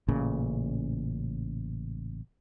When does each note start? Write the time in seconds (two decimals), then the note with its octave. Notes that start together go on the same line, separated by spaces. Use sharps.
0.08 A1 A#2 C#3